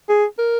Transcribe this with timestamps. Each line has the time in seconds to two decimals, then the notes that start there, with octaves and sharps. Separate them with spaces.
0.09 G#4
0.39 A#4